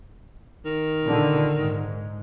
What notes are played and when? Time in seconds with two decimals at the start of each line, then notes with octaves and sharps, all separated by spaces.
0.65 D#3
1.04 A#2 D3
1.57 G#2